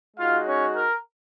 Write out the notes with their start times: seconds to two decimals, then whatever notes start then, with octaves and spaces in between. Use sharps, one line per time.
0.17 G#3 D#4 F4 F#4 F5
0.46 C#4 C#5
0.75 A#4